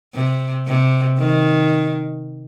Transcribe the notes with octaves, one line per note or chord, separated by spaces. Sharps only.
C3
C3
D#3